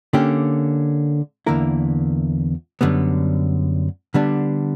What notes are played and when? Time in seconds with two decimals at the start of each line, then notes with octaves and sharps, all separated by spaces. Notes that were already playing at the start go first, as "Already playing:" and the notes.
0.13 D3 A#3 C#4 G4
1.46 E2 D3 A#3 E4 A#4
2.81 F#2 D3 G3 B3
4.14 D3 G3 B3 D4